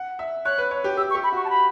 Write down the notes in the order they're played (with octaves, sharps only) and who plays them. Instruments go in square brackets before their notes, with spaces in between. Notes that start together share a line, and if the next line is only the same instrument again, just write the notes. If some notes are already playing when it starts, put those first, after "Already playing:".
Already playing: [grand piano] F#5
E5
[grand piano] C#5 [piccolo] F#6
[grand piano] B4
C#5
G4
[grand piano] G4 [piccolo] E6
[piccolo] C#6
[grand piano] G4
[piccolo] B5
[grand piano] F#4 [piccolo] C#6
[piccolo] A5
B5